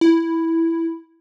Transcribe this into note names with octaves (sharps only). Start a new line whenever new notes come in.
E4